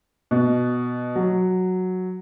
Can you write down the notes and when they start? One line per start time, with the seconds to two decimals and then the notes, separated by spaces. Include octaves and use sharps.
0.31 B2
1.16 F#3